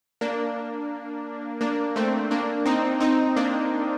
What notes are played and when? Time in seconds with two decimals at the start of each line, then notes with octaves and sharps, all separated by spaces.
0.21 A#3 D4
1.61 A#3 D4
1.96 A3 C4
2.31 A#3 D4
2.66 C4 D#4
3.00 C4 D#4
3.36 A#3 D4